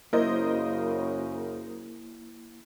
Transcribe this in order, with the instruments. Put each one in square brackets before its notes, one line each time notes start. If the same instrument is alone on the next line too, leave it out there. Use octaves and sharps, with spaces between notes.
[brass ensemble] F#2 C#3 [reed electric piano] A#3 E4 [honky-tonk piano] A#4 C5 D#5